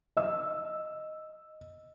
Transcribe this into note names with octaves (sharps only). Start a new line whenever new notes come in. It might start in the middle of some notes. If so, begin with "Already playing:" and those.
D#5 E6